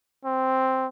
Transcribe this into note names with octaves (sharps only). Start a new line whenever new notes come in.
C4